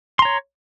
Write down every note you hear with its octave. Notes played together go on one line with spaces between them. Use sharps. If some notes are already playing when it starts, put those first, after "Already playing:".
C#5 A#5 C6